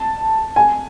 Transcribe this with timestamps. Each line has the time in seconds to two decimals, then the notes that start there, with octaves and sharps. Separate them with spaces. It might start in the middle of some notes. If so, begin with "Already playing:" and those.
Already playing: A5
0.56 G#5